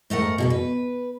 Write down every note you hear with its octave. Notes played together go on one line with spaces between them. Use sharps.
G#2 A3 A#4 F#5
B2 G#4 B4
B4